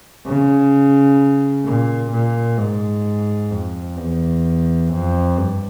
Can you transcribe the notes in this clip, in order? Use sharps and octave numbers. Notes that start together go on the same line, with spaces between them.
C#3
A#2
A#2
G#2
F2
E2
F2
G2